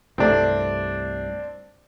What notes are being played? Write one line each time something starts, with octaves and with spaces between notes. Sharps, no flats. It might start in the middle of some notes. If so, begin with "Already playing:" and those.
C2 G2 A3 C4 D4